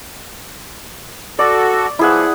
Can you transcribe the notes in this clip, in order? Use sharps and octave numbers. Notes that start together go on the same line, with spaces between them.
F#4 A4 D5
F3 B3 E4 G#4 F#5